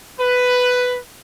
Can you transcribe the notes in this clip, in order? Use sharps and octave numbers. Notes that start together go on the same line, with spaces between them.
B4